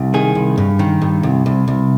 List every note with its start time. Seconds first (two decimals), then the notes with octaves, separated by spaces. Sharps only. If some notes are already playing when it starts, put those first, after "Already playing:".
Already playing: C2
0.14 D#3 G#4
0.35 C2
0.58 G2
0.79 D#3
1.02 G2
1.23 C2
1.46 C2
1.68 C2